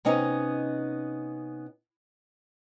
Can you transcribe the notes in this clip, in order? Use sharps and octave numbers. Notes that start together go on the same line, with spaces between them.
C3 B3 C#4 D#4 D#5